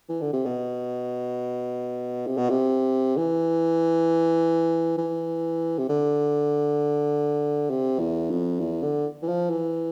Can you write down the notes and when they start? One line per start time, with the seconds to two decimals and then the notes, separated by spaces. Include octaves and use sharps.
0.09 E3
0.21 D3
0.33 C3
0.45 B2
2.27 C3
2.37 B2
2.50 C3
3.17 E3
4.97 E3
5.78 C3
5.89 D3
7.70 C3
7.99 E2
8.30 F2
8.59 E2
8.83 D3
9.22 E3
9.28 F3
9.50 E3